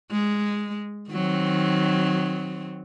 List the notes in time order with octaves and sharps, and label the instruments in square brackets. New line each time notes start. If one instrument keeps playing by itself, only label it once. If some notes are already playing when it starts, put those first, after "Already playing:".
[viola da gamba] G#3
D#3 F#3 C4